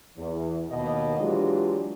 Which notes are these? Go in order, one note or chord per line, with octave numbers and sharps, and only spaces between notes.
E2
D#2 B2 D#5
E3 F#3 G#3 D4 F4 G4